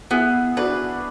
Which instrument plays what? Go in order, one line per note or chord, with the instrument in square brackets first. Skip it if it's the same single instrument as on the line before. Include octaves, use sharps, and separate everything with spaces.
[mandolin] B3 [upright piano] E4 G#4
[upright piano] D4 F#4 [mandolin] B4